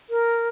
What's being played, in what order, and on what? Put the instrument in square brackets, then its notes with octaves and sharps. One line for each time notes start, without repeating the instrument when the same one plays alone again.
[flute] A#4